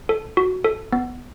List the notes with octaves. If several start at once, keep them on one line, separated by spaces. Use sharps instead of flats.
A4
F#4
A4
B3